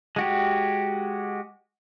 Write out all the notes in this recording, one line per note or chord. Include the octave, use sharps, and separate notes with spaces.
G#3 F#4 G4